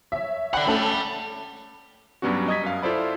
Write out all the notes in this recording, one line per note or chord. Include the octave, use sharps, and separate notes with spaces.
C#5 E5
D5 F#5 G5 B5 F#6
A3 C#4 A4 G5 B5
G2 F#3 G3 B3 C#4 F#4
D#5 D#6 G#6 B6
F#2 F5
E4 F4 A4 C5 D5 B5